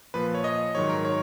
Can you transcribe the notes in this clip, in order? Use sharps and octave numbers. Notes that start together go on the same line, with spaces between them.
A#2 F3 B4
C#5
D#5
G#2 D#3 F#3 C#5
A#4
C#5